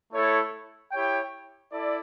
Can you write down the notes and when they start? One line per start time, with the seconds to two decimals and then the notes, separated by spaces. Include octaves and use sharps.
0.11 A3 E4 A4 C#5
0.92 E4 G4 C#5 G5
1.72 E4 A4 D5